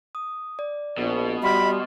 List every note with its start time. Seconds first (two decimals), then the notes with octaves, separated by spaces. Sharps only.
0.15 D#6
0.59 D5
0.98 A#1 B2
1.43 G3 F#4 E5 B5 C6 F6